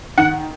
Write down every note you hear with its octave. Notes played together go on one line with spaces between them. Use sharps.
D#3 F#5